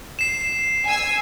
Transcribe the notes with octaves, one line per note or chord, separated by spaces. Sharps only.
C7 E7
G#5 E6